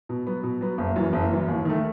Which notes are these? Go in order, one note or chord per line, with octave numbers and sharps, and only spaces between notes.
B2
F#3 B3
B2
F#3 B3
F#1
F#2 E3
F#1
F#2 E3
D#2
D#3 A3